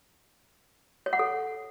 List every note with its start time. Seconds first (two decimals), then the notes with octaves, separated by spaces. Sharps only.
1.06 C#5
1.13 F#5
1.19 A4